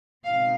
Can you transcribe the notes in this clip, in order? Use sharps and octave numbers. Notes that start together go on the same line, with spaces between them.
B2 G#3 C4 D#4 F5